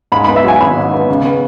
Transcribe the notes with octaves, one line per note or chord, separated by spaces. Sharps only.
G#2 B5
B3 B5
E5
F#3 G#5
G#1 B5
G#2
B3
C#3
B3